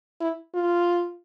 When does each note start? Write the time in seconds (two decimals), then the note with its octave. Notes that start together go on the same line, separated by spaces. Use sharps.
0.21 E4
0.55 F4